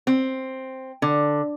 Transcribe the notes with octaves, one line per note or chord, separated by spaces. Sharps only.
C4
D3